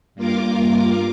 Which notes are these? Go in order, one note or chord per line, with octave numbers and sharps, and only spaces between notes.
G2 A#3 F4 A#4 D6